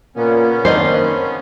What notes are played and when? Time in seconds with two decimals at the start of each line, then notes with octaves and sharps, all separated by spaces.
0.16 A#2 C#3 A#3 B3 C#4
0.65 D#3 A#3 C4 D4 D#4 C5 D#5